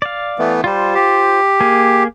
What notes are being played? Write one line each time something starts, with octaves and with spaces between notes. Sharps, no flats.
D5 F5
E3 A3 B3
G3 F4 C5
G4
A#3 G#4